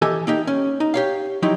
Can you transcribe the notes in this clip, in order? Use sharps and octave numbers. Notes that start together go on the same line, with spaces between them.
E3 G4 A4 D#5 G#5
A#3 D#4 G4
C#4
D#4
G4 C#5 F5
F3 F#3 D#4 E4 G4